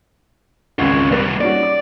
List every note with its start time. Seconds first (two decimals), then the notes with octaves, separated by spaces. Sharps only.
0.79 G#1 C#2 C#4 F4 F#5
1.12 C3 G3 A#3 B4
1.41 C#4 D#4 F#4 D5
1.63 D6